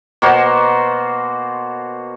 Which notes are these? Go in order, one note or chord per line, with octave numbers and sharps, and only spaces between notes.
B2 A#3 F#4 C5